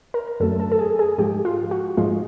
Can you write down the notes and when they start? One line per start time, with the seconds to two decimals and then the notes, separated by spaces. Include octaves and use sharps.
0.14 A#4
0.40 F#2 D3 F#3 A3 A4
0.60 A4
0.72 A4
0.79 G#4
0.99 G#4
1.18 G#2 F3 G#3 G4
1.45 F4
1.71 F#4
1.97 G#2 F3 G#3 F4